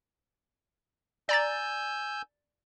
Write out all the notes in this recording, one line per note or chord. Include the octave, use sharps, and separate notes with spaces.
D5 G#5 A#5 E6 G6 A6